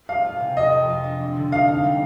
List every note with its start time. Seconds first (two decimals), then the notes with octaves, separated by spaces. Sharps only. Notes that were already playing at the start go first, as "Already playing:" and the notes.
0.09 G#3 F5
0.25 F4
0.40 C3
0.57 F2 D#5
0.72 F2
0.89 F4
1.04 D4
1.21 C4
1.36 D3
1.52 D#4 F5
1.68 D#4
1.84 G3